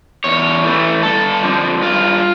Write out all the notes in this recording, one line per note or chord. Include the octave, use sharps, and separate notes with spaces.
E2 C#5
E3 A3
G2 A4
D3 F3
G2 F4